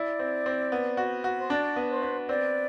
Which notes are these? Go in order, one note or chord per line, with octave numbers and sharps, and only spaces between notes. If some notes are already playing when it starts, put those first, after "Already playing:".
Already playing: E4 D5
C4
C4
B3
F#4
F#4
C5
D4 D5
B3
C5
B3
C4 D5